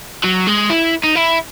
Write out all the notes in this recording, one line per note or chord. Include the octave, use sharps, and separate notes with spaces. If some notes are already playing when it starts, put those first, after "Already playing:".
F#3
G#3
E4
D#4
E4